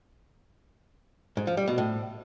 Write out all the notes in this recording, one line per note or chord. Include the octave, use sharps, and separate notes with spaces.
G#2
F3
G3
B2
A2